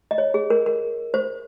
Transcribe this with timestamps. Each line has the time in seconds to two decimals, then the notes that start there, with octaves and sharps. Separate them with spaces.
0.11 D#5
0.18 C#5
0.34 G#4
0.50 A#4
0.66 A#4
1.14 C5